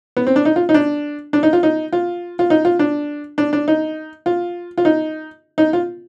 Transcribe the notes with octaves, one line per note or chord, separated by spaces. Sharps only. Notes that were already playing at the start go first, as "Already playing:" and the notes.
B3
C4
D4
D#4
F4
D#4
D4
D4
D#4
F4
D#4
F4
F4
D#4
F4
D4
D4
D4
D#4
F4
F4
D#4
D#4
F4